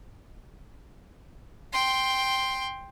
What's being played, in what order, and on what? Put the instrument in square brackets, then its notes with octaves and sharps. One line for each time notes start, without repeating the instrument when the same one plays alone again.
[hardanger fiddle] G5 C6